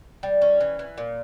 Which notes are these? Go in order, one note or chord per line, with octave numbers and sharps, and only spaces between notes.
G3
C#4
E3
E3
A#2